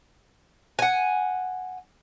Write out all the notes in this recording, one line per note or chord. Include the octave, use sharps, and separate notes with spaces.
F#5 G#5